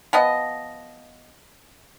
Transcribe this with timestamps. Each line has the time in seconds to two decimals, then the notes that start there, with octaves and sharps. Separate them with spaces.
0.13 F3 B3 D#5